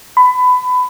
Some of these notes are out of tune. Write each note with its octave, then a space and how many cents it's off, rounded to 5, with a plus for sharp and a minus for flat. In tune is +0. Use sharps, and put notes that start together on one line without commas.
B5 +20